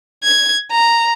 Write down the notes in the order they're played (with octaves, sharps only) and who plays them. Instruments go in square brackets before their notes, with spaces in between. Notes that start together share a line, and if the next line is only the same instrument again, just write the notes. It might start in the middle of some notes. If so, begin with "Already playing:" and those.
[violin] G#6
A#5